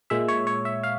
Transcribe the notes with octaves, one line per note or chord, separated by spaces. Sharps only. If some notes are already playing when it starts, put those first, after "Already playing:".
A#2 G#3 E5
C#5
C#5
E5
F5